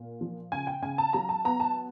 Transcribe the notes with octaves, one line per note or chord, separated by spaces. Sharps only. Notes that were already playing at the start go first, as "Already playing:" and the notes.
Already playing: A#2
F3
C#3 G#5
G5
C#3 G#5
A5
F#3 A#5
A5
B3 A#5
A5